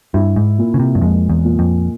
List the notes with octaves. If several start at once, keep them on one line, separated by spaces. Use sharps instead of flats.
G2 E4
G#2
A#2
C#3
C3
G2
F2 G#3
E2
A#2
F2